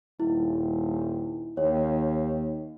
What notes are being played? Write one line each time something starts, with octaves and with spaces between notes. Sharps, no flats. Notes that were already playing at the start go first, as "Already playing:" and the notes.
D#1 E4
D#2 C#5